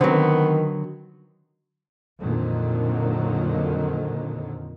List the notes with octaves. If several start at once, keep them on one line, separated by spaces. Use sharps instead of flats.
D3 D#3 F#3 B3 C4
F2 A#2 D3 D#3 F#3